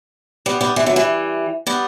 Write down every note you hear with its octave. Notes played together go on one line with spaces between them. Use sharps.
G3 B3
G3 B3
E3 G3
D3 F#3
E3 G3
G3 B3